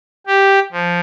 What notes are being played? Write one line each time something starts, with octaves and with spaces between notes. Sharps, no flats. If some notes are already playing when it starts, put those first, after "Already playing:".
G4
F3